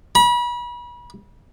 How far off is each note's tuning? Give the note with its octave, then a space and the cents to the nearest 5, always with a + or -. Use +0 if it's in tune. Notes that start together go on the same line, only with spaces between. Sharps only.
B5 -35